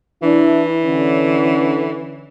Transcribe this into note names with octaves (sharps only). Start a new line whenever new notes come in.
E3 D4 E4
D3 C#4